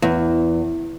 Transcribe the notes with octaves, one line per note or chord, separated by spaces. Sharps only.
E2